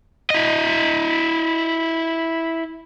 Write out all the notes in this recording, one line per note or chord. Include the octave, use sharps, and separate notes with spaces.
E4 D#5